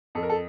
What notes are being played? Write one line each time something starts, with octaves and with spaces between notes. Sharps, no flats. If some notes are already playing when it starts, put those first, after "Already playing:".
F2 A4
A#4
A4